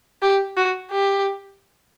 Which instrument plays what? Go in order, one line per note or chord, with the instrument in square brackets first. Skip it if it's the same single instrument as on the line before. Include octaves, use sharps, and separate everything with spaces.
[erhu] G4
F#4
G4